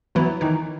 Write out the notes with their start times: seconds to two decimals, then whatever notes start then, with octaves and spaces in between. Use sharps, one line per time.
0.15 E3 F#3 B3 E4
0.41 D#3 E3 D#4